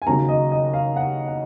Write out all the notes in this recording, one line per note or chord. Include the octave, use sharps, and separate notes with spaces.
G#5
D#2 C#3 F#3 A#5
D#5
D#5
F5
F#5
F#5